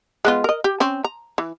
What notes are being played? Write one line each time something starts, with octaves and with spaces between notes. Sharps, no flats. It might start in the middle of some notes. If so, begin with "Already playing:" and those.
G#3 B3 F4
A#4 D#5
G4
C4 C#4
A#5
E3